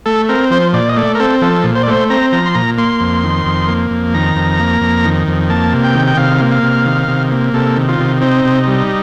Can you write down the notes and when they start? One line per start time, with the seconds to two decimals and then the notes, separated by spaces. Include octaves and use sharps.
0.06 A3 A4
0.29 C4 A#4
0.51 F3 C5
0.73 A#2 D5
0.89 D#5
0.96 A3 D5
1.15 A#4
1.20 C4 A4
1.41 F3 A4
1.64 A#2
1.75 C5
1.83 D5
1.88 A3 C5
2.10 C4 A#5
2.32 F3 A#5
2.46 C6
2.55 A#2 A#5
2.78 A#3 C6
3.01 F2
3.24 D#3
3.46 F2
3.68 A#3
3.91 F2
4.14 D#3 A#5
4.36 F2
4.60 A#3
4.81 F2
5.05 D#3
5.28 F2
5.50 A#3 A5
5.72 C3
5.84 G5
5.95 D#3
6.07 G5
6.17 C3 F5
6.41 A#3
6.51 F5
6.63 C3
6.86 D#3
7.08 C3
7.31 A#3
7.53 C3 A4
7.77 D#3
7.88 F4
8.00 C3
8.21 C4 D#4
8.45 C3
8.67 G3